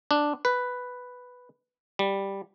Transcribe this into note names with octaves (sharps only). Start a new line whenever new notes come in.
D4
B4
G3